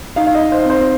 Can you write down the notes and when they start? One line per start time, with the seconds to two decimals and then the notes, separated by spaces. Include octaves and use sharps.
0.16 D#4 F5
0.27 F5
0.35 D#5
0.41 D#4
0.52 C5
0.65 C4 C5